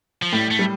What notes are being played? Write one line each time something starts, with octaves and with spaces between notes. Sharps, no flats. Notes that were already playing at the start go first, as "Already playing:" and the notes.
F3
A2 G3
A3
G3